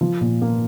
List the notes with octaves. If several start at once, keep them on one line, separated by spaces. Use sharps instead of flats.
F3
A#2
A#3